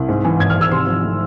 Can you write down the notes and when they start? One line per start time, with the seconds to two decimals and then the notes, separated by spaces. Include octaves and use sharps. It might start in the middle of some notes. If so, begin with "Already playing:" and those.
Already playing: C2
0.08 G#2
0.25 E3
0.39 G#1 G#6
0.50 F6
0.56 G#1
0.61 E6
0.71 C3 C6
0.86 F3
1.03 A3